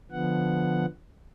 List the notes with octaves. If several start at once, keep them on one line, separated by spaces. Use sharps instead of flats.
D3 F3 B3 F#5